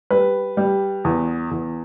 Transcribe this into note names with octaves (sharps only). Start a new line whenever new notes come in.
G3 B4
G3
E2
E2